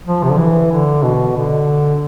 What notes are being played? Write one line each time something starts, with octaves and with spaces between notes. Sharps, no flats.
F3
C3
D3
E3
D3
B2
D3